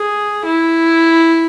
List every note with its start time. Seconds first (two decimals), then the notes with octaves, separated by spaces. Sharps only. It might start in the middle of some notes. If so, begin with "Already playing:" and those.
Already playing: G#4
0.46 E4